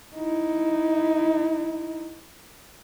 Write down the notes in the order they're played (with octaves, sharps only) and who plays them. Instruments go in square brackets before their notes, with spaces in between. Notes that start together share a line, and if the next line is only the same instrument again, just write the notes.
[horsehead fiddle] D#4 E4